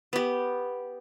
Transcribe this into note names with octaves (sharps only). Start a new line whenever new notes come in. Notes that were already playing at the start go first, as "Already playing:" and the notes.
B3 G4